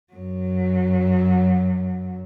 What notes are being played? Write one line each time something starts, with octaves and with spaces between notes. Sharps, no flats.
F#2 F#3